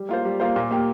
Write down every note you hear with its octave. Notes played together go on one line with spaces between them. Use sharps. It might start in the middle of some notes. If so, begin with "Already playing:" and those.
Already playing: G3
A#3 F4 C5
G3
A#3 F4 C5
A#2
A#3 G4